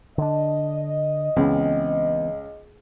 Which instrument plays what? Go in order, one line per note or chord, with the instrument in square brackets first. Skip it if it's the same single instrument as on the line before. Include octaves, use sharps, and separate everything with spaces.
[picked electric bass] D3 D4 [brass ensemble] D#5
[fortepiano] C#2 [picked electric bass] E3 B3 C4